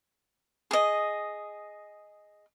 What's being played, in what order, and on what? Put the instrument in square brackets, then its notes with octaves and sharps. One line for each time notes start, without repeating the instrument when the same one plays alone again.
[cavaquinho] G#4 D#5